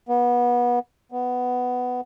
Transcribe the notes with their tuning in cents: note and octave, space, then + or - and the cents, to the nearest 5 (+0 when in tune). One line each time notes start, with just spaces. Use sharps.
B3 -25
B3 +10